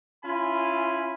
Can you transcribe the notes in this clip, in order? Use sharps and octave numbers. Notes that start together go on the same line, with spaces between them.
C#4 E4 F4 G#5 B5